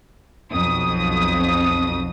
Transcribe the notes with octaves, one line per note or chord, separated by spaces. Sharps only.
B1 F2 D#6